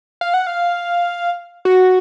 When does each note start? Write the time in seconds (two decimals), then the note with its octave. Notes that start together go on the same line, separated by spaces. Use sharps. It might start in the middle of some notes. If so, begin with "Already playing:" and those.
0.21 F5
0.34 F#5
0.47 F5
1.65 F#4